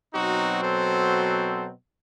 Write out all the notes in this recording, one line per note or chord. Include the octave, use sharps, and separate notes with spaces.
B2 F#3 C4 D#4 F#4
A4 C5